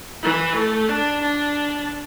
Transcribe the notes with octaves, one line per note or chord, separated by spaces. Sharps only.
E3
A3
D4
D4